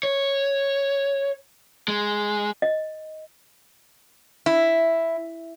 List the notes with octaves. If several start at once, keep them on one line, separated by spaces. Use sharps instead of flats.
C#5
G#3
D#5
E4